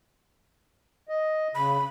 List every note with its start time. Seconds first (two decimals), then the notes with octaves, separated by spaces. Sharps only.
1.09 D#5
1.55 C#3 B5